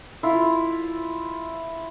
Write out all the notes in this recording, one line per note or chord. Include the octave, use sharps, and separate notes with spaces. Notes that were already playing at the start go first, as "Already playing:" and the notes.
E4 F4